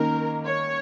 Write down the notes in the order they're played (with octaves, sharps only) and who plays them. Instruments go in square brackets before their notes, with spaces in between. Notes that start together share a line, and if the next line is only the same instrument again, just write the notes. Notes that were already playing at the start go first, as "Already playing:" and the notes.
Already playing: [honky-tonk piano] D#3 A#3 C#4 [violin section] A#4
[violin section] C#5